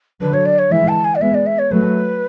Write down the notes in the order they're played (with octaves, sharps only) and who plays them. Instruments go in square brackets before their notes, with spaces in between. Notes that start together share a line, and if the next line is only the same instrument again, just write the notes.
[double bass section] D3 F#3 [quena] B4
[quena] C#5
D5
C#5
[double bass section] E3 G#3 [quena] E5
[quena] A5
G#5
D5
[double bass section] G#3 B3 [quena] E5
[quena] D5
E5
C#5
[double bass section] F#3 A3 [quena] B4